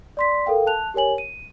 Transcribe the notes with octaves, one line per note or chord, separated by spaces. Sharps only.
D5 C6 B6
A4 A#4 F5 G5
A5 F#6 F7
G4 A#4 C#5 G#5 F#7
D#7